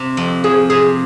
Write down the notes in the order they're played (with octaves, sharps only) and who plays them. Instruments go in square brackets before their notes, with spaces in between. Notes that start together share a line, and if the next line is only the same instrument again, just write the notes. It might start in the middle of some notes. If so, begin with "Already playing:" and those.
Already playing: [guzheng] C3
F2
[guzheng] F3 [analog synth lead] G#4
[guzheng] C3 [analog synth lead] G#4